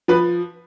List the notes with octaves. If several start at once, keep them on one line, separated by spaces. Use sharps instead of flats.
F3 B4